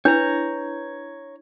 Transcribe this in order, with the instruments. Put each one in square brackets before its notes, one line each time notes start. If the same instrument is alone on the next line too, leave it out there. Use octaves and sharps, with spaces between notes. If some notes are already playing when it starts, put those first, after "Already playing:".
[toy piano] D4 E4 [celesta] B4 G6 [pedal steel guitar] C#5 A#5